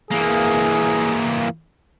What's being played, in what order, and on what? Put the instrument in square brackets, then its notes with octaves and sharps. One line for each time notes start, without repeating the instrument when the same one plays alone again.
[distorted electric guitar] E3 A#3 [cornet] G#4